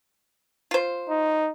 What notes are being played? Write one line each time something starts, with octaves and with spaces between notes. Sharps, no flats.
F4 C5
D#4